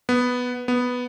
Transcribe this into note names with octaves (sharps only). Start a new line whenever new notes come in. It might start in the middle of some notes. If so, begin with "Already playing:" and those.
B3
B3